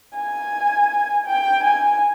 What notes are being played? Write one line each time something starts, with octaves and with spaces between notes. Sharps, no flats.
G#5
G5
G#5